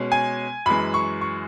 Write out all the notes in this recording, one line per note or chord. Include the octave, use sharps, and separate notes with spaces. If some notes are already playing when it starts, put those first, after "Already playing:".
Already playing: B2 G#3 C#4
G#5
F#2 E3 G#3 B5
C#6
C#6